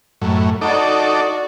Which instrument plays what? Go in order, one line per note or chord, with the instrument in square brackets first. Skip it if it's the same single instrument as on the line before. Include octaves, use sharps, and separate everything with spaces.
[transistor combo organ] F#2 A2
[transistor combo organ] D#4 A4 D6 [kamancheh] F#4 D5